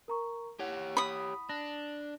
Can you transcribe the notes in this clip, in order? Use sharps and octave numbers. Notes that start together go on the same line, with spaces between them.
A#4 A#5 C#6
E4 G4 C#5 F#5
B5 D#6
D4 A#6